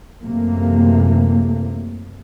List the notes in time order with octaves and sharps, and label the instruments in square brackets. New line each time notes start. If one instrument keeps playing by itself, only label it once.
[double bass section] F#2 C3 E3 A3 A#3